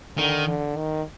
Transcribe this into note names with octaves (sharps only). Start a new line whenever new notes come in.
D3 D#3
D3
D#3